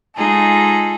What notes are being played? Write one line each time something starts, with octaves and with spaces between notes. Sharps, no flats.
G#3 D#4 F4 G#4 A4